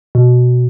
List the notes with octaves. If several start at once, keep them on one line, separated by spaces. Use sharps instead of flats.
B2